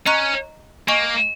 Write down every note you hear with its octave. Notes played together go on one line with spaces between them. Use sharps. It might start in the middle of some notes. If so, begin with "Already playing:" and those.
C#4 D#5 A#5 C#6 F#6
A#3 D#5 G#5 C#6